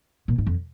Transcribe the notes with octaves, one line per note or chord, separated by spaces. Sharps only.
A#2
G#2
F2